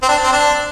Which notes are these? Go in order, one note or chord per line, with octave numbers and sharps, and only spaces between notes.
C4
D4
C4
D4